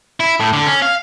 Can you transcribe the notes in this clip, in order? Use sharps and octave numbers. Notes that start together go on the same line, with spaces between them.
E4
A2
D3
C#4
F5